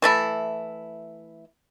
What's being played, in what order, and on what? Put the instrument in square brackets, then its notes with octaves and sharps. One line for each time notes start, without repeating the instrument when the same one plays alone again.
[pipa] E3 A3 E4